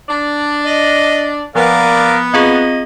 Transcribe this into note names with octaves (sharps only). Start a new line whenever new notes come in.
D4 D5
D#5
F3 B3 A#4 D5 F5
C4 F4 G#4 D#5